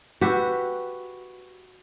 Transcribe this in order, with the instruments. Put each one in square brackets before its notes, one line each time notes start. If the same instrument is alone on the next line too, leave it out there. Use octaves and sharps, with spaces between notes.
[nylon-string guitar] F#4 [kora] G4 B4 E5